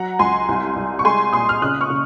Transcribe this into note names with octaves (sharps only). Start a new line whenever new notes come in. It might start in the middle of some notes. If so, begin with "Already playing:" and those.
Already playing: F#3 F#5 A#5
C#2 G#5 C6
C2
C2
C#6
G#3 G#5 C6
A#2 C6 D#6
F6
C#3 D#6 F#6
C#6 F6
C#3